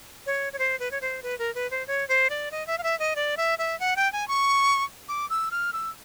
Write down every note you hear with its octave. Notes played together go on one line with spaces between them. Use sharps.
C#5
C#5
C5
B4
C#5
C5
B4
A#4
B4
C5
C#5
C5
D5
D#5
E5
F5
E5
D#5
D5
E5
E5
F#5
G5
G#5
C#6
D6
E6
F6
E6